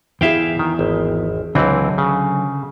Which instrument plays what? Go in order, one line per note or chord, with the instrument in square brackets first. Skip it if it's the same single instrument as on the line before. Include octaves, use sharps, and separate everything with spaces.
[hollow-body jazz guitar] E2 E4 G#4 [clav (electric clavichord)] E5 F5 G5
[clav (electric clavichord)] D#3
G#1
[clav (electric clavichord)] C#2 E3 C4 [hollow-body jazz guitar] D3 F#3
[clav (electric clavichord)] C#3